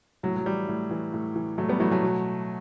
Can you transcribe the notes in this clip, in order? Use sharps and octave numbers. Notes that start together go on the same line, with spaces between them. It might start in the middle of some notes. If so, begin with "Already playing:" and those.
A2 F#3
F#3
E3 G3
A2
E3
A2
E3
A2 F#3 A3
G3 B3
E3 F#3 A3
F#3 A3
B2